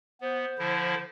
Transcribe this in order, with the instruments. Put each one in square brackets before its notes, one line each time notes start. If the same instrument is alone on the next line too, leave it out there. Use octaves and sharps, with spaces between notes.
[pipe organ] B3 [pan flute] C5
[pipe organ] D3 F3 E4